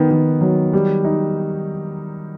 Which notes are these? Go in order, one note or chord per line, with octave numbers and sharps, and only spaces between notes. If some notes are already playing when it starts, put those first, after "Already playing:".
Already playing: D#3 B3
D#3
F#3
G3
D#4